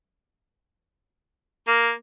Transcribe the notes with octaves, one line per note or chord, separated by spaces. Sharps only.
A#3